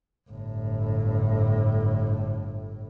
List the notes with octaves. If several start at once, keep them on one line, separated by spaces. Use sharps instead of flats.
G1 A2